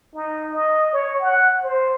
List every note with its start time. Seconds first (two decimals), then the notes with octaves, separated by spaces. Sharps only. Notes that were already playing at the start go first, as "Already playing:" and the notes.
0.15 D#4
0.53 D#5
0.93 C#5
1.21 F#5
1.63 C5